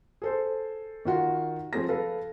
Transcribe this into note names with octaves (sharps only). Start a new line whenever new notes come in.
G#4 A4 C5
D#3 F4 F#4
F3 A3 C4 G#4 A#6
A4 B4 F5